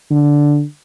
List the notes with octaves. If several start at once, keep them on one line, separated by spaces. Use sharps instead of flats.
D3